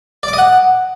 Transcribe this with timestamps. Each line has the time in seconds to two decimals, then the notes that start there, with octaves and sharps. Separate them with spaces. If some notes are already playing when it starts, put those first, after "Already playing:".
0.23 D5
0.28 D6
0.33 D#5
0.38 F#5